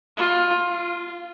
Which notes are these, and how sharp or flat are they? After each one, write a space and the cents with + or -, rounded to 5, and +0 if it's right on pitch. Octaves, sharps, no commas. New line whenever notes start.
F4 +15
F4 -15